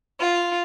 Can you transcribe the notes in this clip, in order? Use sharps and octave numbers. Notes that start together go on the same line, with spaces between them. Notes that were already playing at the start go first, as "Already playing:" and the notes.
F4